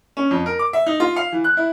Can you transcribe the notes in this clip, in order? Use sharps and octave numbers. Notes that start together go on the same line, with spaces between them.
C#4
F2
A#4
D6
E5
D#4
F4
F5
E3
F#6
E4